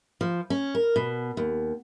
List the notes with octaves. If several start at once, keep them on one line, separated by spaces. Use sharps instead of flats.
F3
C#4
A#4
B2
D#2